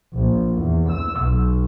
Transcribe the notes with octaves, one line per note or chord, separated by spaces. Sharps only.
A#1
E2
E6
B1